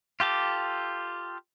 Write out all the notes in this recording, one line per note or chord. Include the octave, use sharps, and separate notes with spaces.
F4 G4 A4 D6